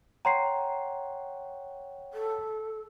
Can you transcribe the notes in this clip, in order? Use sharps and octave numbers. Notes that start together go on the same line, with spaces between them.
C#5 F#5 G5 A#5 C6 C7
A4